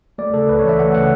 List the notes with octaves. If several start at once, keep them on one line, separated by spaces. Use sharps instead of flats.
A3 D5
C#3 A4
C#2 B4
E3 C#5
E5
A3 F#5
C#3 F#5